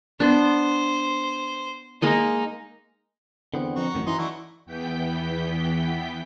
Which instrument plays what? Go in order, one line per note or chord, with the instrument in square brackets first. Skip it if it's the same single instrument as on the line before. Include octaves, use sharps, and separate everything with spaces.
[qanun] B3 D4 [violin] C5
[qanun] G#3 A#3 D#5 [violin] D#4
[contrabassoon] E2 [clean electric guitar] D3 B3 C4
[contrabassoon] F2 [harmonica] D#4 F#4
[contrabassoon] A1 [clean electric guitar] F#2 D#3 F#3
[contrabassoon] E3 [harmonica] D#4 D#5 C6
[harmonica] A3 D4 F#4 [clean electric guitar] E4
[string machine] E2 E3 B3 G5 G6 B6